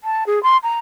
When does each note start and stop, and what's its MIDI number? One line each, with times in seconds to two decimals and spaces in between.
0.04 0.24 81
0.26 0.42 68
0.43 0.57 84
0.63 0.79 82